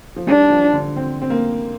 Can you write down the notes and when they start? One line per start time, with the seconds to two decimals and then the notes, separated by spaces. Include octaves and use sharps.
0.16 F3
0.27 G3 D4
0.50 F3
0.73 D3
0.96 C4
1.22 C4
1.30 A#3